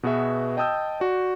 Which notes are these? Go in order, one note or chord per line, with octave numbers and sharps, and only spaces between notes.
B2 B3 F#4 G#4 E5
D#5 G5 A5 D#6 E6 G6
F#4 D5